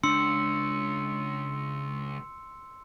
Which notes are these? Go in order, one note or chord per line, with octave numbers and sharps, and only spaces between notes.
C#2 D4 C6 E6 C#7